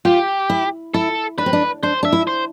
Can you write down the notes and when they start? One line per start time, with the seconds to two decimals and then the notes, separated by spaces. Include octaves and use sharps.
0.05 F4 G4
0.49 E4
0.94 E4 A4
1.38 D4 B4
1.46 C4
1.53 D4
1.83 D4 C5
2.03 D4 E5
2.12 E4
2.27 C5